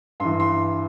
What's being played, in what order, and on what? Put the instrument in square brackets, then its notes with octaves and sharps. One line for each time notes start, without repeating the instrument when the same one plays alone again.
[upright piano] G2 E3 C6
C6